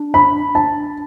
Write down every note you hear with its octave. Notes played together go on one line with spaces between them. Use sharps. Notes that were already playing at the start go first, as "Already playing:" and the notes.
Already playing: D4
B5
A5